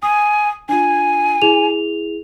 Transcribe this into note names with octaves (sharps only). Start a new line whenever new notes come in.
G#5 D#6
D4 F4 G#5
E4 G#4 F7